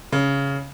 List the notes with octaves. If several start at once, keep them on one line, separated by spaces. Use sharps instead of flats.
C#3